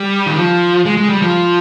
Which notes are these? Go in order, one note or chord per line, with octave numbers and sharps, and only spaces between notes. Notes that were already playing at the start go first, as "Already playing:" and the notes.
Already playing: G3
D#3
F3
G#3
G#3
G3
F3